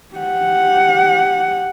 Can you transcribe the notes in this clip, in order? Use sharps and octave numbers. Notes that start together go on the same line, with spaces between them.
G4 F#5